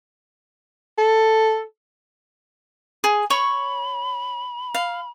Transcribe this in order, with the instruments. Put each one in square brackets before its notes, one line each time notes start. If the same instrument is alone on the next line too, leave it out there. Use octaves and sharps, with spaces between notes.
[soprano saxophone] A4
[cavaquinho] G#4
[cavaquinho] C#5 C#6 [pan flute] B5
[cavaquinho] F5